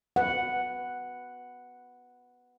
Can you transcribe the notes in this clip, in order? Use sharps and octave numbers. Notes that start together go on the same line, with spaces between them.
B4 F#5